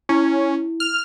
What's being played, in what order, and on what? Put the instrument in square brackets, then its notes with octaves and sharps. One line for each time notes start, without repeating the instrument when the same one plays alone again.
[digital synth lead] C#4 [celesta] E4
[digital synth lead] F6